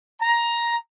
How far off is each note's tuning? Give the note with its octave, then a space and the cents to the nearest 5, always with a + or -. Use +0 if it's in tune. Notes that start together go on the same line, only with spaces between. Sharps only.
A#5 +10